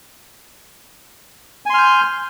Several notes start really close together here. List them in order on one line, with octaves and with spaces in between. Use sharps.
G#5 C6 F6 G6